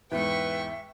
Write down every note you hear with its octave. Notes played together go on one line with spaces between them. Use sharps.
E2 G#2 B4 E5 G5 C#6